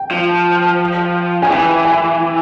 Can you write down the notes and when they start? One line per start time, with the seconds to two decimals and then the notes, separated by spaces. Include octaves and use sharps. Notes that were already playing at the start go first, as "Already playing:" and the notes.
Already playing: G5
0.11 F3
1.43 C#3 G#5
1.50 E3 G5
1.85 G#5